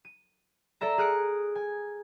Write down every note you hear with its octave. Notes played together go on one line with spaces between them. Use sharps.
D#7
A4 D5 E5 A#5
G#4 D#6 F6 F#6 C#7 D7
G#5